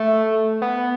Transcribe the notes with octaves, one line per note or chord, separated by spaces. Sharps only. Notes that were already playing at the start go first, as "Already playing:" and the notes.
Already playing: A3
B3